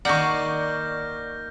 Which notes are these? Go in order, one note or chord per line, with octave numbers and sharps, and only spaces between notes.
D#3 A#3 D5 F#5 C#6 F6 G6 A#6